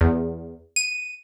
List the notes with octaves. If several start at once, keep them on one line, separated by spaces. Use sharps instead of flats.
E2
D#7